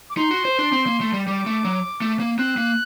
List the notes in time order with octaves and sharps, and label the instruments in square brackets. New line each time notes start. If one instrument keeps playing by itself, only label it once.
[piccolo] D6
[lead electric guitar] D#4 [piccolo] C6
[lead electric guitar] F#4
C5
D4
C4
A#3
A3
G3
[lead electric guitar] G3 [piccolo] D6
[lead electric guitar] A3
F#3
A3
A#3
[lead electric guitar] C4 [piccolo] F#6
[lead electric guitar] A#3